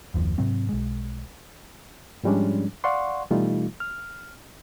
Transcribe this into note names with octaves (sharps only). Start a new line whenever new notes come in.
F#1 D#2 F3
G#2 C3 F#3 C4
B1 G#3
G#2 F3 G3 G#3 C#4 D4
D5 F5 F#5 C6 C#6
B2 E3 G3 A3 D#4 F4
F6